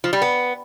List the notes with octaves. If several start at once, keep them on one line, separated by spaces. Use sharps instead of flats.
F3
G3
B3